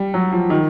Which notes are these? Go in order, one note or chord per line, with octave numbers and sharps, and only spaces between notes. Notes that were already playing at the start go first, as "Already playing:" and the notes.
Already playing: G3
F#3
F3
D#3